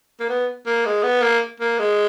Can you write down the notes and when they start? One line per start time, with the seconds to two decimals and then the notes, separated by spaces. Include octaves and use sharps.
0.20 A#3
0.29 B3
0.66 A#3
0.86 G#3
1.03 B3
1.22 A#3
1.60 A#3
1.79 G#3